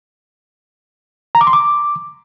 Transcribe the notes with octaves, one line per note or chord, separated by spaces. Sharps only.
A#5
D6
C6
D6